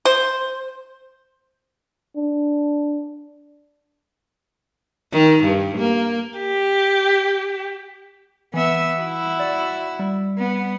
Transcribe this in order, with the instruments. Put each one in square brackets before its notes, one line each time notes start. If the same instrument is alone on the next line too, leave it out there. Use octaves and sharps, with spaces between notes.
[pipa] C5
[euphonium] D4
[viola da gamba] D#3
G2
A#3
[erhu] G4
[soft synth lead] E3 [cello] B3 E5
[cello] E4 F#4
[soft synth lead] D5
G3
[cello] B3